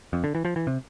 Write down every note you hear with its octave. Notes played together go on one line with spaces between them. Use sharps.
F2
D3
E3
F3
E3
C3